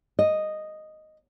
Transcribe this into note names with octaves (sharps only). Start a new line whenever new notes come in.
D#5